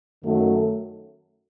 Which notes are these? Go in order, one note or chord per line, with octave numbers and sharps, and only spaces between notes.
F#2 D#3 F#3 A3